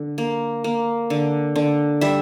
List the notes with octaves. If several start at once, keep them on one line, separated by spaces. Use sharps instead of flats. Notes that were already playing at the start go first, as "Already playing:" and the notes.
Already playing: D3
A#3
A#3
D3
D3
G3 E5